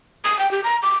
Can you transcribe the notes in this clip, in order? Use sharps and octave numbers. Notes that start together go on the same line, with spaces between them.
D#6
G5
G4
A#5
D6